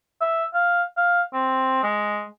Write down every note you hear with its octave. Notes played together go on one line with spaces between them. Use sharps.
E5
F5
F5
C4
G#3